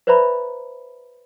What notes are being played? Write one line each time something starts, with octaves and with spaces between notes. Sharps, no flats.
B4 C5 D5 E5 A#5 B5